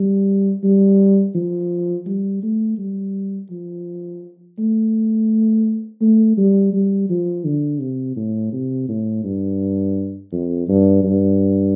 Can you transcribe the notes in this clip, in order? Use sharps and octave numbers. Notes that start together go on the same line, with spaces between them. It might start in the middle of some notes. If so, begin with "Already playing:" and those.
Already playing: G3
G3
F3
G3
A3
G3
F3
A3
A3
G3
G3
F3
D3
C3
A2
C3
A2
G2
F2
G2
G2